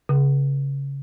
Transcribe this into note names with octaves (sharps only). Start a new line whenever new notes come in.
C#3